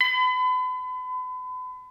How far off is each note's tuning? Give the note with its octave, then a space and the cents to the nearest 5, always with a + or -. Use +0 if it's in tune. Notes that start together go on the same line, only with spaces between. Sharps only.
B5 +40